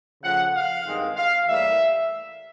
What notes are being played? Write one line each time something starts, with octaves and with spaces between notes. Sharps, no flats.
C#3 F3 A3 F#5
F5
G2 D#3 G#3 C4
F5
A2 E3 G3 A#3 E5